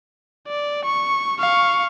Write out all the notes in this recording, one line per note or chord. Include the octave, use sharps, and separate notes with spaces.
D5
C#6
F5 C#6